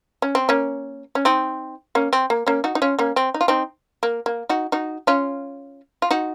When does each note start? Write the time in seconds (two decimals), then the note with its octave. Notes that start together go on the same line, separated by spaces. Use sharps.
0.22 C#4
0.35 C4
0.49 A#3 C#4
1.15 C#4
1.25 C4 D#4
1.95 A#3 C#4
2.13 C4
2.30 A#3
2.47 A#3 C#4
2.64 D#4 F#4
2.75 D#4
2.82 C#4 F4
2.99 A#3 C#4
3.16 C4
3.34 D#4
3.41 F4
3.48 C4 D#4
4.03 A#3
4.26 A#3
4.49 D#4 F#4
4.72 D#4 F#4
5.07 C#4 F4
6.02 F4
6.11 D#4 F#4